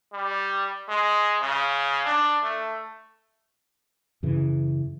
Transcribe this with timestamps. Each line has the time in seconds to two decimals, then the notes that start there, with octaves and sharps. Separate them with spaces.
0.13 G3
0.89 G#3
1.41 C#3
2.06 D4
2.43 A3
4.23 F#2 C#3 E3